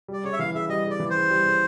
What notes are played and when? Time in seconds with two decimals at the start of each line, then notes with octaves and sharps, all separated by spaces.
0.08 G3 D5
0.24 C#3 C#5
0.33 E5
0.39 E3 F5
0.54 C#3 E5
0.69 G3 D#5
0.85 C#3
0.91 D5
1.00 E3
1.10 C#3 C5
1.30 G3
1.46 C#3